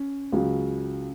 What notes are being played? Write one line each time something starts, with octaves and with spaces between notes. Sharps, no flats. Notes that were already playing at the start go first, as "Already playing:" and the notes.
Already playing: C#4
C#2 C#3 F#3